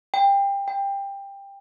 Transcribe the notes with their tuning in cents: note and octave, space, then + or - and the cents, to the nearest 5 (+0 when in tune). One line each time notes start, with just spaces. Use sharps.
G5 +25
G5 +20